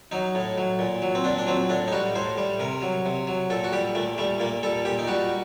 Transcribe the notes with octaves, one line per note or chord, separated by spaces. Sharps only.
F#3 D#4
A2
F#3
A#2
F#3
C4
A#2 D4
D4
F#3 C4
A2 D4
D#4
G3 F#4
A2 C5
G3
C3 A#4
F#3
C3
F#3
A#2 A4
F#4
G3 G4
A#2 A3
G3 A3
A#2 A#3
G3 A4
A#2 G4
D#4
G3 F#4